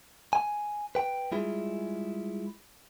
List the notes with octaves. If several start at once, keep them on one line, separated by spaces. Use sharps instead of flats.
G#5
B4 G5
G3 G#3 E4 F4 G#4